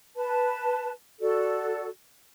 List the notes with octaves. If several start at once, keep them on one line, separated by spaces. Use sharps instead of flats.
B4 A5
F#4 A4 D5